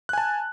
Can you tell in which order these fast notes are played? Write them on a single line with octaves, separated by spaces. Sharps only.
F#6 G#5 A5